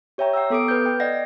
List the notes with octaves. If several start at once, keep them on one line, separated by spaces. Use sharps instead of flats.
G4 C#5 E5 G5 A#5
F#5 G5 A#5 E6
B3 A4 D6 D#6 D7
B4 F6 G6
G5
D5 D#5 F#5 A#6